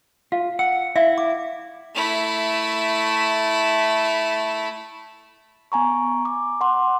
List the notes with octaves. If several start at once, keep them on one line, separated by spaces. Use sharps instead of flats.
F4 F5
F#5 E6
E4 E5 F5 E6
D6
A3 E4
B3 G#5 A#5 C#6
D6
F#5 C6 D6